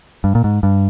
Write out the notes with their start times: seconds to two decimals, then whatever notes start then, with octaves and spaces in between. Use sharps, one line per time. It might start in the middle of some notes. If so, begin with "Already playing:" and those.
0.24 G2
0.35 A#2
0.44 G#2
0.63 G2